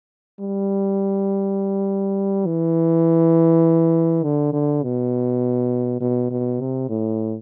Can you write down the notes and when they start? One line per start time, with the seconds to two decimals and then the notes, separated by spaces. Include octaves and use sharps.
0.40 G3
2.46 E3
4.24 D3
4.53 D3
4.83 B2
6.01 B2
6.31 B2
6.61 C3
6.89 A2